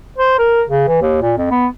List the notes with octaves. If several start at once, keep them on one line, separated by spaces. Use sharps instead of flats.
C5
A#4
C#3
E3
D#2
A#2
F2
B3